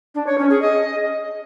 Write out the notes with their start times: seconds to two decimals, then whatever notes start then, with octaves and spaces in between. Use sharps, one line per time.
0.15 D4
0.26 C#5
0.38 C#4
0.50 G#4
0.62 D#5